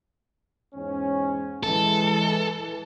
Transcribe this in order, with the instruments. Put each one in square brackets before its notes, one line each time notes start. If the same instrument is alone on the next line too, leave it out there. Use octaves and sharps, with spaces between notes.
[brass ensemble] E2 G#2 C#4
[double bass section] E3 [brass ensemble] G#3 [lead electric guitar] A4